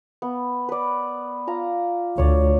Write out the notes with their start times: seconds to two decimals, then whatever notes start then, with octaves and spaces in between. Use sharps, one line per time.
0.22 B3
0.69 B4 D5
1.47 F4 A#5
2.18 D2 C#5 D5